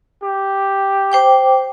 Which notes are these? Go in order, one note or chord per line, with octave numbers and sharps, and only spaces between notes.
G4
C5 G5 D6